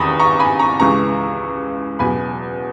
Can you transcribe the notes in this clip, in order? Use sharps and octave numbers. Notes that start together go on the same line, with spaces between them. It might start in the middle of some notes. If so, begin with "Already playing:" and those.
Already playing: E2 D#3 A#5 B5 C#6 D#6
A#5 C#6
G#5 B5
A#5 C#6
C#2 C#3 E3 A#5 C#6
E2 B2 F#3 G#5 B5